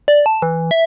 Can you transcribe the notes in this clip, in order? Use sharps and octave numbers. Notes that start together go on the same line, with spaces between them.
D5
A5
E3
E5